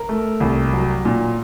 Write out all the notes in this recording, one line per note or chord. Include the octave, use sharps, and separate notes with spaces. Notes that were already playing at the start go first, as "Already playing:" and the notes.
Already playing: A#4
A3
C2
F#3
A#2